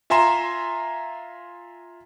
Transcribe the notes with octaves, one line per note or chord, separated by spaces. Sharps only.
F4 E5 G#5 A#5 C6 E7